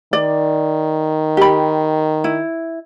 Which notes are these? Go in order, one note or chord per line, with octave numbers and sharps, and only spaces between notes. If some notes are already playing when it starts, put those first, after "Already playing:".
D#3 D5
G4 B5
E4